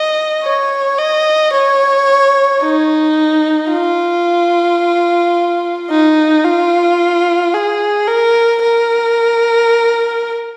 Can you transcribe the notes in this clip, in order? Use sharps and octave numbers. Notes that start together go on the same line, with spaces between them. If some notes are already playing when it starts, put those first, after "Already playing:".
Already playing: D#5
C#5
D#5
C#5
D#4
F4
D#4
F4
G#4
A#4
A#4